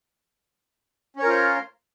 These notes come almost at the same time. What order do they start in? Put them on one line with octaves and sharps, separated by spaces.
C#4 C#5 A#4 F4 C5